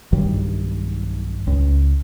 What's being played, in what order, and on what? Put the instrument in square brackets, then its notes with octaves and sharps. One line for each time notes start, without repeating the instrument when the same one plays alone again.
[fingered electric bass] B1 G2 D#3 G3
C#2